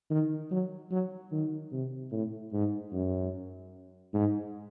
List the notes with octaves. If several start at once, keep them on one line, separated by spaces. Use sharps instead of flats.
D#3
F#3
F#3
D#3
C3
A2
G#2
F#2
G#2